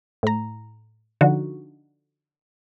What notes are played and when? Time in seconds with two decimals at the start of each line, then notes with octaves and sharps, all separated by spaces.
0.23 A2 A#5
1.21 D3 F3 D#4 F#4